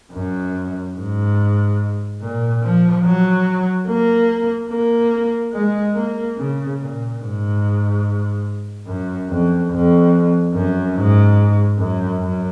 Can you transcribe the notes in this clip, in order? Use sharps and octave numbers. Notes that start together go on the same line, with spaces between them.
F#2
G#2
A#2
F3
F#3
A#3
A#3
G#3
A#3
C#3
A#2
G#2
F#2
F2
F2
F#2
G#2
F#2
F#2